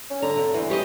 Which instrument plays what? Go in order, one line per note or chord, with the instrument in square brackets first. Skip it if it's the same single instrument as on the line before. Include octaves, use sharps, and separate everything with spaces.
[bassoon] C#4
[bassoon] D3 [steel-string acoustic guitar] A#5
[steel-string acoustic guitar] C3
[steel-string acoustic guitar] E2 [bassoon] E3
[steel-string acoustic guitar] G4 C#5 D#5